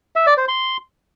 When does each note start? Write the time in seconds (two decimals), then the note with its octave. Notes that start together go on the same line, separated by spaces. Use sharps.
0.16 E5
0.27 D5
0.37 C5
0.48 C6